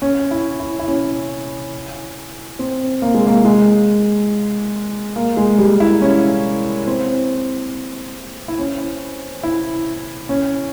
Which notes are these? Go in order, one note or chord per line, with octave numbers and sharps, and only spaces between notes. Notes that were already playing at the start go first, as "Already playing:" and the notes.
C#4
E4
E4
E4
C#4
C4
A#3
G#3
A#3
G#3
A#3
G#3
G3
E4
C#4
C4
E4
C#4
E4
C#4